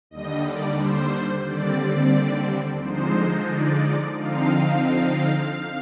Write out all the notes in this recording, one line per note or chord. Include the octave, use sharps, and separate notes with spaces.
D#2 D3 G3 D#5
D5
C5
D#2 D3 G3 C4 D5
D3 F3 G#3 D#4 C5
D5
D3 F3 C4 D#4 F5